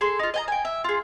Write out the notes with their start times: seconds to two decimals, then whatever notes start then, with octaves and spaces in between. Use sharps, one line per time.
0.01 G#4 A4 C6
0.19 D#4 F4
0.34 D#5 G#5 A#5
0.48 G5 G#5
0.65 E5
0.84 F4 G#4